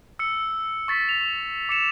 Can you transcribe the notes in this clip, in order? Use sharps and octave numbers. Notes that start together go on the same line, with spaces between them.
E6 C#7
C#6 A6 B6
F7
D6 C#7 E7